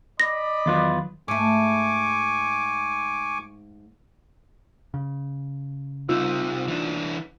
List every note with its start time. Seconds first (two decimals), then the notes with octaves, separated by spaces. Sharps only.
0.20 D5 D#5 B5 A#6
0.66 E2 D#3 F#3 F4 B4
1.28 G#2 A3 G#5 C#6 D6
4.94 C#3
6.09 C2 C3 D#4 F4 E6
6.68 E3 D4